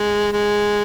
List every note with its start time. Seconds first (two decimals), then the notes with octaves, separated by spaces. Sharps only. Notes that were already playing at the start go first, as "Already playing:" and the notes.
Already playing: G#3
0.33 G#3